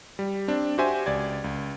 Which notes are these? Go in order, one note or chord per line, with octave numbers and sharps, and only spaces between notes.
G3
C4 D4
F#4 G4 C5 E5 G#5
C#2 D5 G#6
C#2